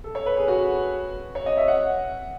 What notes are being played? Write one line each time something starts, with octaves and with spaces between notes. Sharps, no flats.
A4
C#5
B4
G#4
F#4
C#5
D#5
E5
F#5